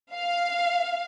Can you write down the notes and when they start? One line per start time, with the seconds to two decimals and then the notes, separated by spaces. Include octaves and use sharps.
0.14 F5